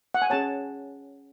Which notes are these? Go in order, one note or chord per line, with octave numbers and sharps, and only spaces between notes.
F#5
G#5
C#4 G#4 C#5 A5